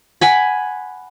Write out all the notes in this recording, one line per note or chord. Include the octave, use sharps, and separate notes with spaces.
F#5 G#5 B5